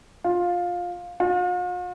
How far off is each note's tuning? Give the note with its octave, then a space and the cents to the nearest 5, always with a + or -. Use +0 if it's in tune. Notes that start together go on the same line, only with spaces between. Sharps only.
F4 +15
F4 +45